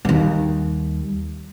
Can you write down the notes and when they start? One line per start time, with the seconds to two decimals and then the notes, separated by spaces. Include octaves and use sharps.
0.05 D#2 G3